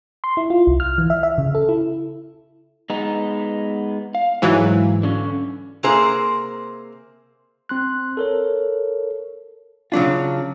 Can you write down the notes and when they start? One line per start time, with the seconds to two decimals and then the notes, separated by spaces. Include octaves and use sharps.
0.24 C6
0.37 E4
0.50 F4
0.67 C2
0.80 F6
0.98 E3
1.10 E5
1.23 E5
1.38 C#3
1.55 A4
1.69 E4
2.90 G#3 B3 D#4
4.15 F5
4.42 G#2 E3 F#3
5.03 D3 C#4
5.83 C3 A#3 C4 G#4 C5 A#5
7.69 C4 C6 F#6
8.17 A4 A#4 C#5
9.92 C#3 F#3 D4 F4